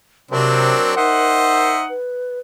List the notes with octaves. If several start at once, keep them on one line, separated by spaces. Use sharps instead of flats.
C3 F#3 C4 D4 A#4
D#4 C5 D#5 E5 F#5
B4